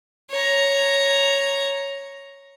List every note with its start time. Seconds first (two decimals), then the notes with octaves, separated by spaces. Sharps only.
0.31 C#5 A#5